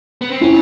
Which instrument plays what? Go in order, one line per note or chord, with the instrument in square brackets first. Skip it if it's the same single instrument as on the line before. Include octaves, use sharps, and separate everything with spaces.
[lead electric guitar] B3
C4
[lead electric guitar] C#4 [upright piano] E4